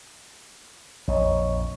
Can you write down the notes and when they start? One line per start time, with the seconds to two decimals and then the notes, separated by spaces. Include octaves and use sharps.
1.08 A#1 F2 C#5 D#5 C#6